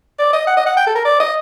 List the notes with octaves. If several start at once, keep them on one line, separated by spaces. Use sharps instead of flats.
D5
D#5
F#5
D#5
F#5
G5
A4
A#4
D5
D#5